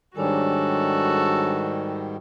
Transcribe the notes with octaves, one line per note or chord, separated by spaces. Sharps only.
G#2 D#3 G3 D4 F#4 A4 C#5 G#5